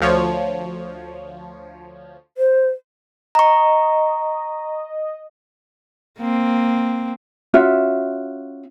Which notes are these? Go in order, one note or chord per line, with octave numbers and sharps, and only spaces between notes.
D2 F3 C#5
C5
D#5 A#5 C#6
A#3 C4
C#4 F4 F#4 E5